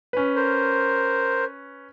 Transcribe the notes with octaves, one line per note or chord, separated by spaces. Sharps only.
C#4 B4
A#4 C5